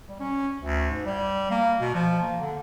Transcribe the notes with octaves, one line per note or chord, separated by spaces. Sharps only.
G3
C#4
D2
G#2
G3
A#3
B2
F3
A#3
D3